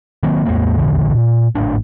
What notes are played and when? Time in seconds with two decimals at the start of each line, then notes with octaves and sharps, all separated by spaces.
0.23 D#3 F#3 A#3 C4
0.45 E2 A2 G#3 A#3
0.78 D#1 A#1 E2 D3
1.12 A#2
1.55 G#1 A2 D4